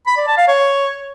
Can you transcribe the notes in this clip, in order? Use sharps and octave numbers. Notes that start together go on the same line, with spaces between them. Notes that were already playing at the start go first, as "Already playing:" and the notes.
B5
D5
A5
F5
C#5